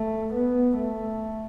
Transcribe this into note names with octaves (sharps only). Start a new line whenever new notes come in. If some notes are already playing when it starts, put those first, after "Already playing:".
Already playing: A3
B3
A3